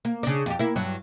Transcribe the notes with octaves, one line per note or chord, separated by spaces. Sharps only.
A#3
C#3 D4
F2 G4
A#3 E4
G2 F#3